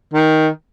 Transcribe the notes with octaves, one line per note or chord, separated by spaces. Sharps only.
D#3